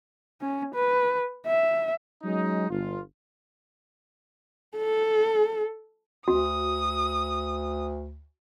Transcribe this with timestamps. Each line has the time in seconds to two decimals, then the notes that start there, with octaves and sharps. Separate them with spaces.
0.41 C#4
0.75 B4
1.47 E5
2.23 F#3 G#3 C#4 D#4
2.69 G1 F4
4.77 A4
6.28 D2 F#4 D#6